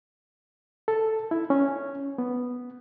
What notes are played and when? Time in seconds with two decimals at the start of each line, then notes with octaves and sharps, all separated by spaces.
0.88 A4
1.31 E4
1.50 C#4
2.18 B3